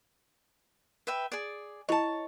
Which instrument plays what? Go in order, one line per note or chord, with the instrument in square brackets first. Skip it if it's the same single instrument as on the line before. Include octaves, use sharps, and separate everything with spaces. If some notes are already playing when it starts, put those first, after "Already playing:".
[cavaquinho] B4 E5 G5
G#4 D5
[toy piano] E4 D#5 [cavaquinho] C#5 A5